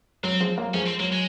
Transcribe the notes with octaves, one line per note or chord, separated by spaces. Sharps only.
F#3 C4
F3 G#3
F#3 A#3
F3 G#3 C#4
C4
F#3 A#3
G#3